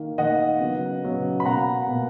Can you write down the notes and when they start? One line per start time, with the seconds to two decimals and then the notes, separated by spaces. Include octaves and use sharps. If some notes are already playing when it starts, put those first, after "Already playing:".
Already playing: D#3 A#3
0.18 D#3 A#3 D#5 F#5
0.60 C#3 F#3 B3
1.03 C#3 F#3 B3
1.40 B5
1.45 B2 A#3 F#5 A#5
1.88 B2 A#3